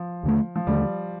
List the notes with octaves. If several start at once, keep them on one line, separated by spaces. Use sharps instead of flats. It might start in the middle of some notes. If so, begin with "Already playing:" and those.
Already playing: F3
D#2 D3 A3
F3
D#2 D3 G3 A3